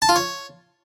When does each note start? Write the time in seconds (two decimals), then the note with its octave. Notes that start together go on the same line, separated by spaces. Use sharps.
0.02 A5
0.09 F4
0.16 C#5